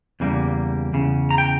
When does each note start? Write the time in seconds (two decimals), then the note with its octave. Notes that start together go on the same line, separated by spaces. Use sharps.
0.20 E2 C#3 G3 A#3
0.94 E2 C#3
1.31 A#5
1.38 G5